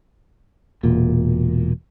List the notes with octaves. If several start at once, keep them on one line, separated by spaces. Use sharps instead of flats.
E1 A#2